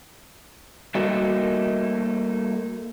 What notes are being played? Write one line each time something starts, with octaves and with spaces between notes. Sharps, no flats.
G3 A3 A#3 D#4 F#4 A4